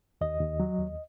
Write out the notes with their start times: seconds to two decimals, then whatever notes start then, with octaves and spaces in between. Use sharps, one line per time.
0.21 D#2 D#5
0.41 D#2
0.60 F#3
0.79 D#2